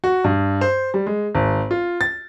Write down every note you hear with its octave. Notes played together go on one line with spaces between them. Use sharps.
F#4
G2
C5
G3
G#3
G#1
F4
A6